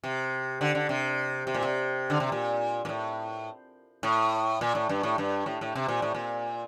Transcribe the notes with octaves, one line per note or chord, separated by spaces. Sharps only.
C3
D3
D3
C3
C3
A#2
C3
D3
C3
A#2
A#2
A2
A2
A#2
A2
G2
A2
G2
A2
A2
C3
A#2
A2
A#2